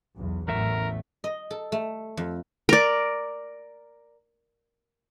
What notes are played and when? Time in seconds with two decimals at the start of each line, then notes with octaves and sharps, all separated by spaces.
0.17 B1 E2
0.48 A1 E2 F#3 A3 A#4 E5
1.24 D#5
1.51 A4
1.72 A3
2.17 F2
2.69 A#4 D5